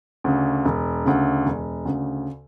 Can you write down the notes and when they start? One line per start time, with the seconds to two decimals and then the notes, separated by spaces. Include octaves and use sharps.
0.24 D2 C#3
0.65 E1
1.05 D2 C#3
1.46 E1
1.85 D2 C#3